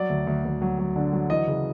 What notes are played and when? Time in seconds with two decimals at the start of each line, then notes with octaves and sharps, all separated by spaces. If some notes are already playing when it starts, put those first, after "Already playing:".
Already playing: F#3 D5
0.09 D2
0.27 D2
0.45 D2
0.62 F#3
0.79 F#3
0.96 D3
1.13 F#3
1.30 E3 D#5
1.47 C#3